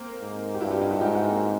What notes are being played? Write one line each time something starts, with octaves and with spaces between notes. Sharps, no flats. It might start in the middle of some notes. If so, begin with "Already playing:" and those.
Already playing: A#3 C4
G#2
G4
G2 E4 F#4
F4 G4
D#4 F4
E4 F#4
G#2 F4 G4
E4 F#4
A#3 C4